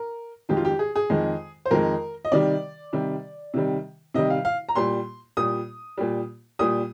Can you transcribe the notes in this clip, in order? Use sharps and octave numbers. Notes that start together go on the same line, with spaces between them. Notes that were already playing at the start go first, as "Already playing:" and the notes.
Already playing: A#4
F2 D#3 G#3 G4
F4
G4
G#4
G#4
F2 D#3 G#3
C5
F2 D#3 G#3 A#4
D#5
C3 D#3 G3 D5
C3 D#3 G3
C3 D#3 G3
C3 D#3 G3 D#5
F5
F5
A#5
A#2 G3 C6
A#2 G3 D#6
A#2 G3
A#2 G3 D#6